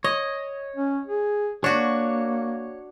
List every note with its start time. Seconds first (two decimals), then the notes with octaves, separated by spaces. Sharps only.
0.04 C#5 D#5
0.76 C#4
1.07 G#4
1.64 A#3 D4 F#4 C#5